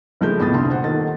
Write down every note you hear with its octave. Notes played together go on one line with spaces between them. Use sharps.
F#1 F3 G#3 A3 G6
F2 A2 B3 D#6 A6
C2 D3 C6
C5 F#5
D#1 D#3 A4 A6